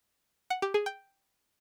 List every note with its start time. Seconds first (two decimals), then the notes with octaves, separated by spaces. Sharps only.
0.50 F#5
0.62 G4
0.74 G#4
0.86 G5